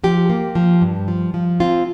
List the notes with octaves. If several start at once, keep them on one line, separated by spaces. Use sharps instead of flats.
F3 G4
A#3
F3
G2
F3
F3
C4 F4